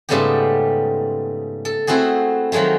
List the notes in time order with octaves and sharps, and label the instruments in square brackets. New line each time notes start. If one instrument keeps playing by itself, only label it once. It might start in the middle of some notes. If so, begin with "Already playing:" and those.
[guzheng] G#2 C#3 G3 A3 B3 G4
A4
A3 C4 E4 F#4 G#4
D#3 F3 F#3 G#3 A3